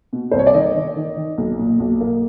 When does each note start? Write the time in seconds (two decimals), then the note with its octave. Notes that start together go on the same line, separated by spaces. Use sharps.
0.13 B2
0.31 C2 C5
0.39 C#5
0.47 D5
0.54 D#3 D#5
0.75 D#3
0.96 D#3
1.17 D#3
1.38 B1
1.59 A#2
1.80 B1
2.01 A#3